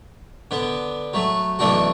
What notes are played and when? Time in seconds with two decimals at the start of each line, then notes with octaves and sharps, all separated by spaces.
0.51 D3 B3
1.14 F#3 A3
1.59 B1 E3 A3 D4 F#4 A4